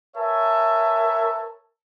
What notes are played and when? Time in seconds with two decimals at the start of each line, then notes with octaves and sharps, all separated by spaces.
0.16 A#4 B4 C#5 E5 G#5 A5